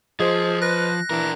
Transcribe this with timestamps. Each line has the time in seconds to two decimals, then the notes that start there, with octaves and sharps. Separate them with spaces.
0.20 F3 G#4 C5 D#5
0.62 B4 F#6 A#6
1.10 E3 D4 A#4